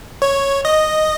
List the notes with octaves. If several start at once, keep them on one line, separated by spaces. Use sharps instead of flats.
C#5
D#5